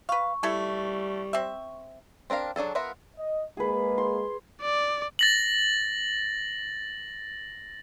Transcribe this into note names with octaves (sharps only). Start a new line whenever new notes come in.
B4 F5 C#6
G3 A3 E4 A4
C4 E5
C4 D4 A#4 F5
F#3 D4 G#4 A4
B3 F4 A#4 E5 F#5
D#5
G#3 A#3 G#4 B4
C6
D5
A6 A#6 F#7